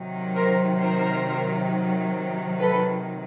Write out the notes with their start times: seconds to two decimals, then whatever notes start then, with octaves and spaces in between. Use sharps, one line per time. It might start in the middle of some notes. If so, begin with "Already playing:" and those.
Already playing: C3 D#3 F#3
0.35 A#4 C5
0.80 A#4 C5
2.60 A4 B4